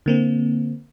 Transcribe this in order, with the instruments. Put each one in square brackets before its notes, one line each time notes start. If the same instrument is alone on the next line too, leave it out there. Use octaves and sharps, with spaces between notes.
[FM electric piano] D3 A#3 C4